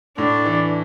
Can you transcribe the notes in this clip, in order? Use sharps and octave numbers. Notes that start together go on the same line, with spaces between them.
A2 D4
E3